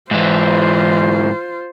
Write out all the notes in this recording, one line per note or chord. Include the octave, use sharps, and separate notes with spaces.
G#2 E3 F4 C5